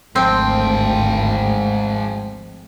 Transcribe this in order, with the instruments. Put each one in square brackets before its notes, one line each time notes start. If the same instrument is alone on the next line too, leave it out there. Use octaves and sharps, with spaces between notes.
[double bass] G#1 D2 [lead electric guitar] G#2 G5 [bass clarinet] F3 [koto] C4